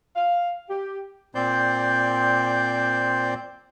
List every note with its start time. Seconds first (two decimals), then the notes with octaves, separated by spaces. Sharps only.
0.16 F5
0.70 G4
1.35 A#2 C4 C5 D5 G6